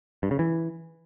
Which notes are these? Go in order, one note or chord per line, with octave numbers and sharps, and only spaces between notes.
G2
C#3
E3